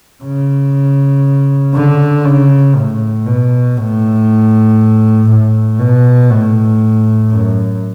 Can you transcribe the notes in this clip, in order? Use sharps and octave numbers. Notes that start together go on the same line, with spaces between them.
C#3
D3
C#3
A2
B2
A2
A2
B2
A2
F#2